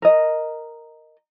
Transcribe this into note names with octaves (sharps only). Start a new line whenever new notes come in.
A#4 D#5